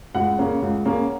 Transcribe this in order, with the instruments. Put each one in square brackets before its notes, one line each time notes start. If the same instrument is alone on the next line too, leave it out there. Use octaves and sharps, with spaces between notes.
[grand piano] C#2 F#5
C#3 A#3 C#4
C#2
C#3 A#3 C#4